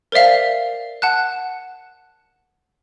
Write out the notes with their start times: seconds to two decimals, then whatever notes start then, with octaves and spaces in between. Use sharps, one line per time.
0.12 A#4 C5 D5 E5 F5
1.02 F#5 A5 F#6